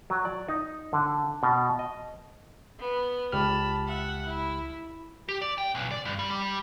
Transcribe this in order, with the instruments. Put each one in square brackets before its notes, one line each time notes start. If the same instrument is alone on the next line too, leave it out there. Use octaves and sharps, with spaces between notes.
[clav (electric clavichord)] F#3
D5
D#4
D3
B2
D#5
[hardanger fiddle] B3
[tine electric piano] C#2 G4 F6 [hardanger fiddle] A5 B5
[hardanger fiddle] E5 F#5
E4
[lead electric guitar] G4
D5
G5
B1
D5
G2
G3
G3